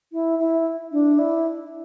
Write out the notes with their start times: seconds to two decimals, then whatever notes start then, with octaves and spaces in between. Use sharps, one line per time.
0.13 E4
0.39 E4
0.92 D4
1.19 E4